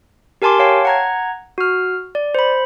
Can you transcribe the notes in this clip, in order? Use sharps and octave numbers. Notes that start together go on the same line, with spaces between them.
G4 A#4 G#5 A5 C6 D6
C#5 F5 G5 A5
F#5 A#5 G#6
F#4 F6
D5
C5 B5